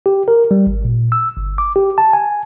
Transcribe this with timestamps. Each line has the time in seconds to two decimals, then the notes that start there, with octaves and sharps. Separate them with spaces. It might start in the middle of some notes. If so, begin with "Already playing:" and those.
0.06 G4
0.28 A#4
0.51 G3
0.67 G#1
0.85 A#2
1.12 E6
1.37 G1
1.58 D6
1.76 G4
1.98 A5
2.13 G#5